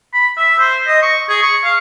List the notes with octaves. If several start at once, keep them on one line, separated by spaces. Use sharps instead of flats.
B5
E5
C5
D#5
C#6
G#4
C#6
F5